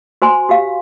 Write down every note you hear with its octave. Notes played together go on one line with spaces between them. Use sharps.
F#4 C5 G#5 C6
F#4 G4 F5